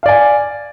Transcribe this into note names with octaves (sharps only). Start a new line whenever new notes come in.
D5 F5 G#5